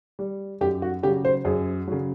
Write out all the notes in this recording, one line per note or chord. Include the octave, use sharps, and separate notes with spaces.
G3
F#2 G4
F#4
C#3 F#3 G4
C5
F#2 G#4
C#3 F#3